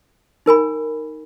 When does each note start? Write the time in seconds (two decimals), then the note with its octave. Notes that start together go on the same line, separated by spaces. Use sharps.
0.46 D#4 A#4 G#5 B5